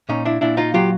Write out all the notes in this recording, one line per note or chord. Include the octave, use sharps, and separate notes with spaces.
A#2 C#4 D#4
D4 E4
A#2 D4 E4
D#4 F4
F#3 F4 G4